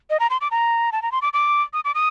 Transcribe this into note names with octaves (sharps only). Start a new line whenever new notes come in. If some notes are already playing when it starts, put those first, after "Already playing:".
D#5
A#5
C6
D6
A#5
A5
A#5
C6
D6
D6
D#6
D6
D#6